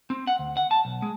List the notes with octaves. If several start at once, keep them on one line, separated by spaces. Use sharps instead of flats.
C4
F#5
D2
F#5
A5
B1
G#3